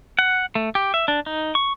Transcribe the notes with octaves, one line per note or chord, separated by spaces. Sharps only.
F#5
A3
G4
E5
D4
D#4
C#6